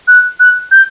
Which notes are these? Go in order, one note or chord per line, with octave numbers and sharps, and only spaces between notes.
F#6
F#6
G6